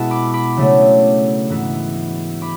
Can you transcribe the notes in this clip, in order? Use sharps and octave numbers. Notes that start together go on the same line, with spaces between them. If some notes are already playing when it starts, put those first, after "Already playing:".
Already playing: B2 G#3 B3 E4 A5
B5 D6
B5 D6
C#3 F#3 A3 D4
G#2 E3 B3 E4
B5 D6